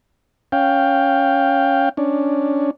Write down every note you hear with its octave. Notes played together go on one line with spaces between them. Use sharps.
C#4 F5 G5
C#4 D4